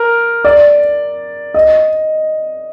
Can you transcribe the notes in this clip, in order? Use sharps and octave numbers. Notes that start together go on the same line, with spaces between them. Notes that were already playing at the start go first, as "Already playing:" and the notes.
Already playing: A#4
D5
D#5